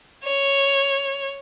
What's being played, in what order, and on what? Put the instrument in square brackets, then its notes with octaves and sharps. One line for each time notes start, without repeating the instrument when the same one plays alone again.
[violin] C#5